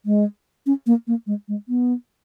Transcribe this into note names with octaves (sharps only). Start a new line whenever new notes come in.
G#3
C#4
A#3
A#3
G#3
G#3
B3